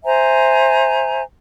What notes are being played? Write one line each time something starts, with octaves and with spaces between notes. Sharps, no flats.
C5 E5 G#5 A#5